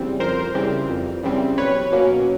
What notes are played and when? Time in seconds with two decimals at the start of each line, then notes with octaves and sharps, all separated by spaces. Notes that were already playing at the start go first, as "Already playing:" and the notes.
Already playing: C#3 E3 G3 C4
0.20 F2 A#4 C5
0.55 C#3 E3 G3 C4
0.89 F2
1.23 C#3 E3 G3 C4
1.57 B1 B4 C#5
1.92 B2 F#3 A#3 C#4